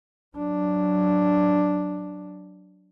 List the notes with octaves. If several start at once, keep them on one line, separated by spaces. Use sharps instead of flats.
F#3 D4